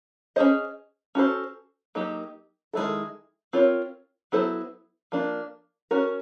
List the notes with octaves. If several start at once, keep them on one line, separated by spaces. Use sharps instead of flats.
C#4 F4 G#4 C5 D#5
C#4 F#4 A4 C5
F#3 A#3 D#4 G4
D#3 G#3 C#4 E4 A4
C4 F4 A#4 C#5
F#3 B3 E4 A4 C5
F3 A#3 D4
C#4 F#4 A#4